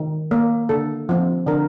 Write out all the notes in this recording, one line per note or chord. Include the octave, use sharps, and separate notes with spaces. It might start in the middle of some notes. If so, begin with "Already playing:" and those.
Already playing: D#3
A#3
D3 A4
F3 C4
D3 A#4